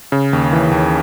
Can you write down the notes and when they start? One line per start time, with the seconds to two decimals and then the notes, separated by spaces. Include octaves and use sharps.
0.12 C#3
0.33 D#2
0.53 E3
0.71 D#2